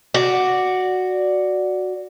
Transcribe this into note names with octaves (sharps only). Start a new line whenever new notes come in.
F#4 D5